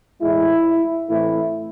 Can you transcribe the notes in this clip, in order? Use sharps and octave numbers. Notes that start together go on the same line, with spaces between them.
A2 E3 G#3 E4
A2 E3 A3 C4 E4